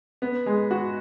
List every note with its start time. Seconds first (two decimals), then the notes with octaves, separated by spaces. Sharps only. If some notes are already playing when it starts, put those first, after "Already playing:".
0.22 B3
0.46 G#3
0.71 F#4